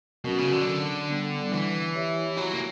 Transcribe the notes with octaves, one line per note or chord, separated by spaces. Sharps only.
B2 F#3 C#4 F#4 A#4
C#3
D3
G3 B3 D4
E3
E4 G4 C#5 E5
F#3
A#3